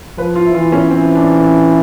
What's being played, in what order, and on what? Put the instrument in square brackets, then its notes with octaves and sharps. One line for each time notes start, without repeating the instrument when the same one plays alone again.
[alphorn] F3 [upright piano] B4
[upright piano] F4
E4
[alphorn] E3 [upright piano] F4
[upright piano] C#4
[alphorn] E3 [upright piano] C4
[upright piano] D4